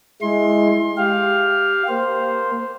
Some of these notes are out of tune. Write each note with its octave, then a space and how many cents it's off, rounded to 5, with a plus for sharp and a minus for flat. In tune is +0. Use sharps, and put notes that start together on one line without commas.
G#3 +0 E4 +0 C6 +25
G4 +0 F5 +5
A#3 +0 C5 +0